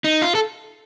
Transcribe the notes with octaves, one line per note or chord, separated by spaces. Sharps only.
D#4
F4
A4